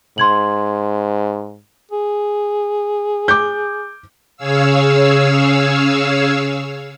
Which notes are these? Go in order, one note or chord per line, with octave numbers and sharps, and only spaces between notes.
G#2 C6 G#6 F#7
G#4
D6 G6
C#3 G#4 C#5 F5 E6